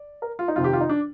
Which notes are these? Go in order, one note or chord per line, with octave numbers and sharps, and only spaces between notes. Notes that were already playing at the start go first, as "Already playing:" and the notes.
Already playing: D5
A#4
F4
D#4
F2 C3 D#3 F4
G4
F4
D#4
D4